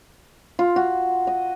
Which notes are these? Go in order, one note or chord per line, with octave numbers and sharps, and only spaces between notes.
F4
F#4
D#5